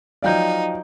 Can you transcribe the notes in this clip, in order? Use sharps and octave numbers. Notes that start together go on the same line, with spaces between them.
F3 F#3 D#4 D5 F5 G5 G6